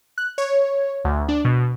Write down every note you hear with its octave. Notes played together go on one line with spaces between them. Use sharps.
F#6
C#5
D2
D4
B2